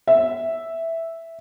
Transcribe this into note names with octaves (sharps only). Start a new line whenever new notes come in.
E5